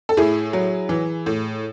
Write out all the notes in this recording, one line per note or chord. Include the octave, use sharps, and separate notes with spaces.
A4
A2 E4 G#4
F#3
E3
A2